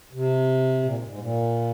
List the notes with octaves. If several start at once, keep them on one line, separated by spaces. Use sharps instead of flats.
C3
A#2
G#2
G#2
A#2